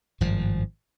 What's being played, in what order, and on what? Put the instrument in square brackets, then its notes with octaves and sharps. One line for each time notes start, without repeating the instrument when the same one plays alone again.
[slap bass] G#1 G2 F3